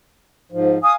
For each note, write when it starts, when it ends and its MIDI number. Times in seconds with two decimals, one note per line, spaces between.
0.52 0.78 44
0.52 0.78 53
0.83 0.96 77
0.83 0.96 80
0.83 0.92 87